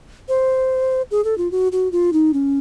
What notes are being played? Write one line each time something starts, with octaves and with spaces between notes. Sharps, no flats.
C5
G#4
A4
F4
F#4
F#4
F4
D#4
C#4